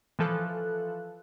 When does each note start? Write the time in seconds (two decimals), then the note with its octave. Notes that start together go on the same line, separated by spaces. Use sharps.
0.19 E3 F3 A4 F#6